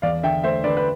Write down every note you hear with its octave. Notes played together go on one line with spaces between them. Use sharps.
E2 D5 F5
D3 E5 G5
A3 C5 E5
D3 B4 D5
B4